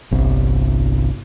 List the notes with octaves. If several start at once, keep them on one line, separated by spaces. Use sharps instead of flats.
G1 C2